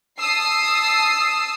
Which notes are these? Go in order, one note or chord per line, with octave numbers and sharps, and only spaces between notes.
A5 D#6 E6 C7